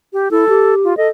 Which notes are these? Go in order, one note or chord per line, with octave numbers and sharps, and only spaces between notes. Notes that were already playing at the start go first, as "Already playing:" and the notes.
G4
E4 A4
G4
F4
A4 D#5